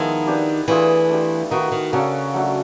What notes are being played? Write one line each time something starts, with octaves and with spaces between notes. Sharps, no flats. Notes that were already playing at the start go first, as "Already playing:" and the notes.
Already playing: D#3 F3 G#3 B3 E4
D4 G4 B4
E3 A3 D4 F4 G#4
A3 D4 G4
D#3 D#4 F#4 B4
D#3
C#3 A#3 D4 F#4 A4
F#3 A3 D4 F#4